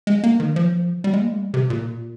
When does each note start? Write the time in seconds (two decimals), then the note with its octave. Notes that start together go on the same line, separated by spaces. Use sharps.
0.07 G#3
0.24 A#3
0.40 D#3
0.56 F3
1.04 G3
1.14 G#3
1.21 A#3
1.29 G#3
1.37 G3
1.54 C3
1.70 A#2